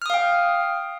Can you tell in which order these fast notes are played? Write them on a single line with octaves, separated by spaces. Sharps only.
F6 D#6 F5 G5